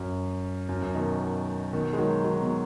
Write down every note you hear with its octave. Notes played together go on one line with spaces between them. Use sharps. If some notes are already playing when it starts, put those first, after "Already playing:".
Already playing: F#2
F#2
F#2
B2 D#3
B2 D#3
G#3
D#3 F#3
D#3 F#3
B2